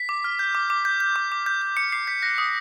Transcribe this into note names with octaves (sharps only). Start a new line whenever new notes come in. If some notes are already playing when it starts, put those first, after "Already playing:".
Already playing: B6
D6
F6
G6
D6
D6
G6
G6
D6
D6
G6
G6
D6 C#7
D6 C7
G6 B6
F#6 A#6
D#6